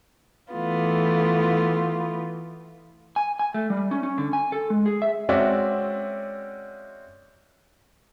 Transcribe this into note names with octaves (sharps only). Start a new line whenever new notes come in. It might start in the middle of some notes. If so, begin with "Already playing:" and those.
E3 A3 B3 F4
G#5
G#5
A3
G3
C#4
C#4
D3
G#5
A4
G#3
G#4
E5
G#3 C4 C#4 F#4 D5 E5